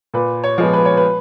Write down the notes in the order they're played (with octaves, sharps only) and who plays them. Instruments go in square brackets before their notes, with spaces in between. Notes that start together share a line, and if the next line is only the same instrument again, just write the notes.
[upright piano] A#2 B4
C#5
F3 G#3 B3
B4
C#5
B4